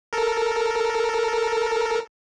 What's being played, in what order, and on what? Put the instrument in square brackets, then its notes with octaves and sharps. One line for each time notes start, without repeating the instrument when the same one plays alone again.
[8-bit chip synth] A4 A#4